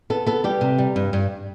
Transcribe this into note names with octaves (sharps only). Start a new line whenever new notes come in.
B3 A4
B3 A4
G3 G4
C3
G3
G2
G2